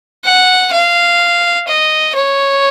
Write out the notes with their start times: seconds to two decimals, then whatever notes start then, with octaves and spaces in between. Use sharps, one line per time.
0.25 F#5
0.73 F5
1.68 D#5
2.15 C#5